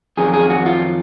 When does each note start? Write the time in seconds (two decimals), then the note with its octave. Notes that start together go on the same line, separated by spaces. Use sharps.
0.17 F2 D#3 F#3 G#4
0.34 G#4
0.50 F#4
0.66 F4